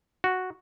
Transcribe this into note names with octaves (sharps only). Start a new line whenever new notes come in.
F#4